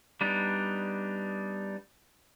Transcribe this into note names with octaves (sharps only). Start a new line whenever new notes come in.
G3 B3 D4 D#4